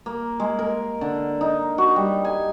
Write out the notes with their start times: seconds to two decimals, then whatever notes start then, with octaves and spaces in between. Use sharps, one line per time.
0.06 A#3
0.40 G#3
0.59 A#4
1.01 D3
1.41 D#4
1.78 F#4
1.96 G3
2.25 G#5